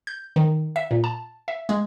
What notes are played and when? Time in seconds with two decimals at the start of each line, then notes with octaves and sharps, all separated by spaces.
0.07 G6
0.36 D#3
0.76 E5
0.91 A#2
1.04 A5
1.48 E5
1.69 G#3